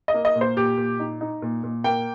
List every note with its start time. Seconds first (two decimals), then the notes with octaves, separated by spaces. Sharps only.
0.08 D#5
0.14 A#3
0.25 D#5
0.35 A#2
0.41 C5
0.57 A#2 G4
0.77 A#2
0.99 D#4
1.21 D#4
1.42 A#2
1.63 A#2
1.84 A#3 G5